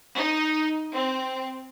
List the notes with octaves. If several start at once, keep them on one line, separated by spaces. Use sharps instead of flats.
D#4
C4